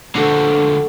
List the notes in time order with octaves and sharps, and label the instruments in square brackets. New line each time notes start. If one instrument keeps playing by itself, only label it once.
[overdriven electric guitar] D3 F3 [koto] A3 F#4